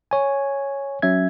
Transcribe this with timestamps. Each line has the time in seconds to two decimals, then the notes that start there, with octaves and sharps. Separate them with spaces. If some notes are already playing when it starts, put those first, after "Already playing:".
0.11 C#5 G#5
1.02 F#3 C#4 E5 G#6